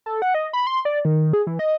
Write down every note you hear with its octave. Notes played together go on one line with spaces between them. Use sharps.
A4
F#5
D#5
B5
C6
D5
D#3
G#4
E3
D#5